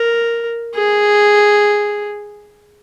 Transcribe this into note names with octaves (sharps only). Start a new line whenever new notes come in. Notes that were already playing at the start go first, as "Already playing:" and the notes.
Already playing: A#4
G#4